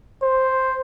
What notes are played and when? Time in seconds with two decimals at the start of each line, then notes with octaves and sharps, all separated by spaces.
0.22 C5